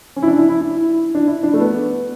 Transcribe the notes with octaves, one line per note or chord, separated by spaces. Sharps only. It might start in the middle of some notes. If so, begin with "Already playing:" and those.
C#4
E4
D4
E4
E4
E4
D4
E4
D4
A3
B3